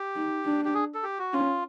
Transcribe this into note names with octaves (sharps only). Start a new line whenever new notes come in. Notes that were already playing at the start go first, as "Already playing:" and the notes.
Already playing: G4
D#4
D4
G4
G#4
A4
G4
F#4
C#4 F4